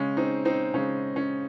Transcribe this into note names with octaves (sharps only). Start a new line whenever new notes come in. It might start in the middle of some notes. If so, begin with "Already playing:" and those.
Already playing: C#3 G#3 C#4
C4 D#4
C4 D#4
C#3 G#3 C#4
C#4